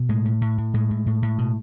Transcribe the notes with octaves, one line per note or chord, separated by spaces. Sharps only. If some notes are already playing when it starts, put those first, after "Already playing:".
Already playing: B2
A2 G#3
A2
A2
A2
A2 G#3
A2
A2
A2
B2